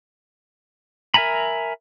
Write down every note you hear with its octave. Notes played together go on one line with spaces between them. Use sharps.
A#4 E5 G#5 A#5 B5